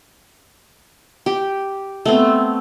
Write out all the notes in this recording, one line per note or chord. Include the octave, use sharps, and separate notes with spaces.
G4
A3 B3 C4